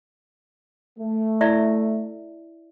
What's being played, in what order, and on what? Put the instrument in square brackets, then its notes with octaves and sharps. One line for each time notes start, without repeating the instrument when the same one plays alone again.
[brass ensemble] A3
[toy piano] E4 D5 E5